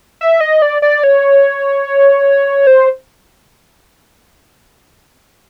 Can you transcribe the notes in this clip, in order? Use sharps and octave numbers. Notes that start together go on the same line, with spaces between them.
E5
D#5
D5
D5
C#5
C5